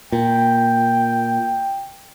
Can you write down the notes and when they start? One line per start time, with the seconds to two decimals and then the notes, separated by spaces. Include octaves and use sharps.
0.12 A#2 G5